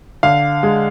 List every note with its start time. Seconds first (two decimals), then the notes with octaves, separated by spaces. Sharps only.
0.23 D3 F5
0.63 G#3